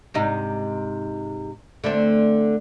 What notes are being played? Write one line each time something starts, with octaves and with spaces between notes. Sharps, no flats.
G#2 C3 D#4
D3 A3 C4